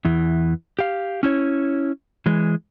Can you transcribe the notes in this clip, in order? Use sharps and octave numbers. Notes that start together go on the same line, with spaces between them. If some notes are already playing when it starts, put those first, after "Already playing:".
E2 E3
G4 F5
C#4 E4 C#5
E3 G#3